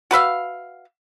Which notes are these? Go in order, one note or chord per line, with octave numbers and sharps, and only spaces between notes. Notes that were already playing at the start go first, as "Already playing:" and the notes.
F#4 B4 E5 F5